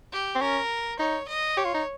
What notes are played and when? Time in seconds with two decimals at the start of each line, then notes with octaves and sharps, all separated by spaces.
0.12 G4
0.35 C4
0.41 C#4 A#4
0.99 D#4 C#5
1.28 D#5
1.57 G4 C#5
1.65 F4
1.74 D#4